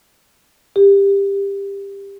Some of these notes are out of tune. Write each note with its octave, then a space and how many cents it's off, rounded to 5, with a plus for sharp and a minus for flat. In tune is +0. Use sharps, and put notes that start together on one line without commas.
G4 +20